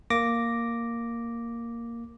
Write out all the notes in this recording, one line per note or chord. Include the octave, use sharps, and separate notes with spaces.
A#3 D6 A#6